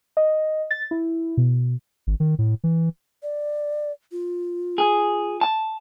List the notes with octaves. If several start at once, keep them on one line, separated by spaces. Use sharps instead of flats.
D#5
A6
E4
B2
G#1
D#3
A2
E3
D5
F4
G#4
A5